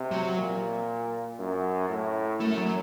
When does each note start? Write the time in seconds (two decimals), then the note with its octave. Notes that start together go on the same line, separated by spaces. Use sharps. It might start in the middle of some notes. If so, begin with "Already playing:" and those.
Already playing: C3
0.11 F#3
0.37 A#2
1.39 F#2
1.89 A2
2.40 F#2 A3
2.57 F#3